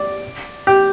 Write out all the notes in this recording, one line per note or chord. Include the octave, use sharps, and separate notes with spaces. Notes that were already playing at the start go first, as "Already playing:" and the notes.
Already playing: D5
G4